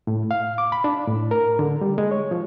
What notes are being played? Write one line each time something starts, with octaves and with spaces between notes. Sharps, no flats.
A2
F5
D6
B5
D4
A2
A#4
D3
G3
G#3
C#5
F3